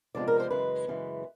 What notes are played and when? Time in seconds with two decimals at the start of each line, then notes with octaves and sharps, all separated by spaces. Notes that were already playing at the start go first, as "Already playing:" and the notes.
0.15 C3 F3 G#3 B3 D4 D5
0.28 A#4
0.40 C5
0.50 F#2 C#3 E3 G#3 B4
0.87 F#2 C#3 E3 G#3